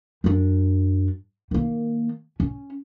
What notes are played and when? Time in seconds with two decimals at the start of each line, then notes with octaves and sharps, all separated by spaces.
0.24 F#2 D4
1.51 D#3 A#3
2.40 C#4